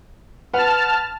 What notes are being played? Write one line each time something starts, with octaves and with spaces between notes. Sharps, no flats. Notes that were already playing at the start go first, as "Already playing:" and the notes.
B4 F#5 A5 F6